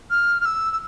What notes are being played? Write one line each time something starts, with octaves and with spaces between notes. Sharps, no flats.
F6
F6
E6
E6